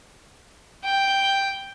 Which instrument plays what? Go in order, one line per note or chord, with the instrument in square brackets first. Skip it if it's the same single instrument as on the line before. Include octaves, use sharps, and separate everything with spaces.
[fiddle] G5